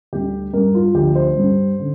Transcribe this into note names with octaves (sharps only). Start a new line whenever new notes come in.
D2 D3 G3 G4
G2 G3 A#4
F4
D2 D3 F3 G4
C5
G2 G3
D3